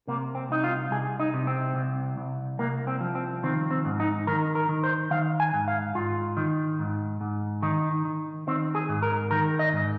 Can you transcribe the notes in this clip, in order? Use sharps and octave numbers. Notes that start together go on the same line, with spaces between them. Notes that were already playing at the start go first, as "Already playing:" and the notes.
C3 A#3
C4
C2 D#4
F4
C2 G#4
D#4
C3
C4
C2
C2
C2 A#3
C4
F3
C4
D#3 C4
C4
G#2
D#4
D#3 A#4
A#4
D#3
C5
D#3 F5
G#5
G#2
F5
G#2 F4
D#3
G#2
G#2
D#3 D#4
D#3
D#3 C4
G#4
G#2
A#4
D#3 A#4
D#5
G#2